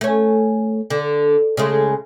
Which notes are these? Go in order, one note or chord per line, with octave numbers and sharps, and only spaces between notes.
A3 C#4
D3
C#3 G#3 A3